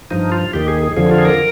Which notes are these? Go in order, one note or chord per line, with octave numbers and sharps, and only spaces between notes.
G2 F3 D#4
F4
D#2 D#3 G4
G#4
G#4
F2 D3 F3 G#4
F4
G#4
A#4